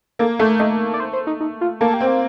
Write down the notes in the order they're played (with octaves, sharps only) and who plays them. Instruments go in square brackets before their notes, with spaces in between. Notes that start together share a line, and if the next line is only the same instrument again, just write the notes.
[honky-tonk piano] A#3 [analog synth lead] A4
[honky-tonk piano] A3 [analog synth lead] A4
[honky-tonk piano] A3 [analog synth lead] D#5
[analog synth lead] D5
C5
C5
D#4
D#4
F4
[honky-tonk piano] A#3 [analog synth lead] A4
[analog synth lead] G4
[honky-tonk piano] C4
[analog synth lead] F4